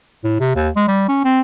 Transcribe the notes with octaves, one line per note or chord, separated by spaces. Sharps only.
A2
C3
D#2
G#3
G3
C#4
C4